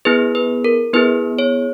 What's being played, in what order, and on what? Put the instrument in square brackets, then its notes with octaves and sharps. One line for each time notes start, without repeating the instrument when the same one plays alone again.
[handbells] B3 E4 G#4 B4
B4
A#4
B3 E4 G#4 B4
C#5